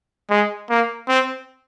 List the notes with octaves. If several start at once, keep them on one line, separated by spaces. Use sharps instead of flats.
G#3
A#3
C4